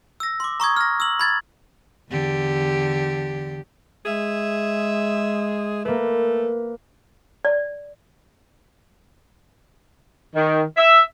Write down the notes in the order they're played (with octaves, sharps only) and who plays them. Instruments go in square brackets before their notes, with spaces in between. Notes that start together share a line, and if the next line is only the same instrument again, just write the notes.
[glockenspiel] E6 A#6
C6 D6
A#5 C#6 D#6 G#6
F6 A#6
E6 F#7
B5 G#6 A6
[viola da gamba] E2 D3 G4
[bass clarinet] G#3 [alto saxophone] G#4 [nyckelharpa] E5
[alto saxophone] A3 [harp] A#3 B4
[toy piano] D5
[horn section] D#3
E5